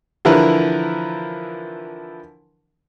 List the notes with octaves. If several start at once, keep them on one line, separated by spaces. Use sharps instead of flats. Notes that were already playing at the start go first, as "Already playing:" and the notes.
D3 E3 F3 E4 A#4 B4